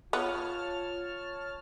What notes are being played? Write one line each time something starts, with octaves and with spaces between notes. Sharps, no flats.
B3 F4 C#5 A5 F6